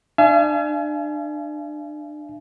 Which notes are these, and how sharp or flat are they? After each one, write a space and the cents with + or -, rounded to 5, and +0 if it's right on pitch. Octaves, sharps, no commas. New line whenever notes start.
D4 +30 F5 -45 G#5 +30